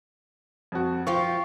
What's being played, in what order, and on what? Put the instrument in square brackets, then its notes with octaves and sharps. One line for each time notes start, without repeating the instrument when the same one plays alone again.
[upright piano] F2 F#4
[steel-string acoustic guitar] F3 F4 G4 [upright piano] C#6